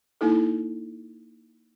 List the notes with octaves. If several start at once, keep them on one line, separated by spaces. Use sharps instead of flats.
A#3 D#4 E4 A4